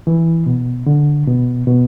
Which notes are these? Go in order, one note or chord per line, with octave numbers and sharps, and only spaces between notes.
E3
B2
D3
B2
B2